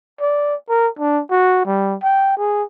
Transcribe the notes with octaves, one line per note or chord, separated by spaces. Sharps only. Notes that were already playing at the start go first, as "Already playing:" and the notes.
D5
A#4
D4
F#4
G3
G5
G#4